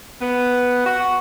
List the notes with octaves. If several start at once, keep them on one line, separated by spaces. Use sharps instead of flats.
B3
F#4